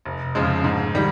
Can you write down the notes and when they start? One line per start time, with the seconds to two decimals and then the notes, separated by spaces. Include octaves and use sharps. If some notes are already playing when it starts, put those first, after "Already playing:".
0.06 F1
0.35 F2 C#3 F3 G#3
0.64 G#2
0.95 D#3 G3